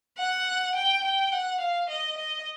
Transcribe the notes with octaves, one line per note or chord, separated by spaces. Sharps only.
F#5
G5
G5
F#5
F5
D#5
D#5